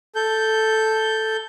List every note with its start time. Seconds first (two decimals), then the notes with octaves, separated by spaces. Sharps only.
0.15 A4 G6